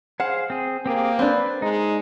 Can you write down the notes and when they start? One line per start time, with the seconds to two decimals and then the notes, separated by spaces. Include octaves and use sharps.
0.20 G#4 C5 F5 F#5
0.50 C4 G#4
0.86 A#3 C4 G4 G#4
1.19 C4 D4 B4
1.62 G#3 D#4